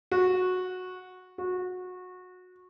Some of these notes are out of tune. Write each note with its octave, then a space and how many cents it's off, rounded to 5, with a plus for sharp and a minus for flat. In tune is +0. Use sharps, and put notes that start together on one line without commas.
F#4 -10
F#4 -20